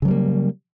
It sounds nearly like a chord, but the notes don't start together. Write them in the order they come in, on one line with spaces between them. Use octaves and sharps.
C#3 F#3 G3 A#3